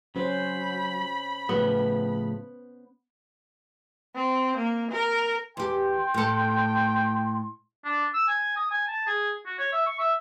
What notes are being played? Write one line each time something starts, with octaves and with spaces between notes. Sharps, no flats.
F#3 C#4 C5 B5
A2 C#3 F3 B3
C4
A#3
A#4
E2 G4 G5 C6
A2 A4
D4
E6
G#5
D#6
G#5
A5
G#4
F#4
C#5
E5
C#6
E5